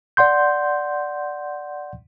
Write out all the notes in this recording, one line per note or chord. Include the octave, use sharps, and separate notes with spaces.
D5 F#5 C6 G6